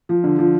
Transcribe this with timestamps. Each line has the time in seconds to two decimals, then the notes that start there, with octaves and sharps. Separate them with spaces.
0.09 F3
0.24 D3
0.39 F3